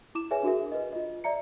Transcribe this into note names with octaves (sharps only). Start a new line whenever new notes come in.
E4 D6 E7
G#4 B4 C#5 E5 G#5
D4 F#4 G#4 A#4 E5
B4 D#5
F4 D#5
D5 E5 A#5 C#7